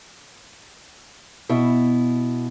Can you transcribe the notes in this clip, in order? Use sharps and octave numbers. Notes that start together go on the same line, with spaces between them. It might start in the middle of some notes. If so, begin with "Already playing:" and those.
B2 E4